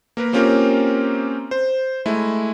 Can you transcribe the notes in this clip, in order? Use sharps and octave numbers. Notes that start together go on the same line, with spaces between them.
A#3 A#4 B4
A#3 C4 C#4 F4 G4 A#4
C5
G#3 A3 E4